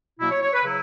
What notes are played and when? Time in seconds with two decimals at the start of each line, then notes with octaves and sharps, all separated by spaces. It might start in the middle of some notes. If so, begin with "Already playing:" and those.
0.20 B2 F#3 A#3 E4
0.31 C#5
0.42 C#5
0.53 B4
0.64 C#3 F#3 E4